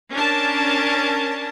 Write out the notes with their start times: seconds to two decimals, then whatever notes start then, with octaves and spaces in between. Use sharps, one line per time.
0.11 C#4 D4 A#4 A5